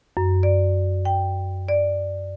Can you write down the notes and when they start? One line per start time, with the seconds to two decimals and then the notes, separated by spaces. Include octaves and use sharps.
0.17 F#2
0.43 D5
1.05 G5
1.69 D5